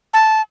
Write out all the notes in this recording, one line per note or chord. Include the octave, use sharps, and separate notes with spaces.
A5